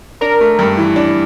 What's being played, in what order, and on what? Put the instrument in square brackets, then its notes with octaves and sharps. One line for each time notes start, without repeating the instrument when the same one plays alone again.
[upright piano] D4 [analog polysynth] A#4
[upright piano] A3
G2
E3
D4